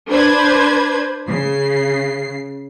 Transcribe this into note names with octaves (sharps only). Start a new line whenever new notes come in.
D4 B4 C5 G#6
C#3 C7